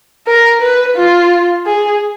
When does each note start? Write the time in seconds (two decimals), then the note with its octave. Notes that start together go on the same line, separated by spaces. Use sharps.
0.27 A#4
0.61 B4
0.96 F4
1.66 G#4